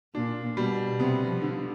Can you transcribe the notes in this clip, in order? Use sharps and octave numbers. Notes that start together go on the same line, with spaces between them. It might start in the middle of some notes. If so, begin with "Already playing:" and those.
A#2 D4
B2 G3
C3 B3
F3
D3